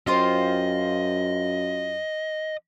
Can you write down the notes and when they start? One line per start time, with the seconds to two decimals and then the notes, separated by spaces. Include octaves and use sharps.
0.07 F#2 F4 C5 D#5 G5